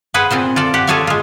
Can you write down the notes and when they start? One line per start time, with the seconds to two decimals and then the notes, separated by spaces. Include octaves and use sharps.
0.14 G#4 B4 C5 F#5
0.31 A#2 C4 F4 C5
0.56 F4 A4 D5
0.74 G4 F#5
0.87 F4 G#4 A4 C#5 D5 F5
1.07 G#3 F4